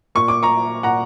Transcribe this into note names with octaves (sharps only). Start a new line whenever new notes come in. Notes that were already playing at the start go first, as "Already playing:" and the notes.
A#2 C#6
D6
A#5 C#6
A#2 F#5 A#5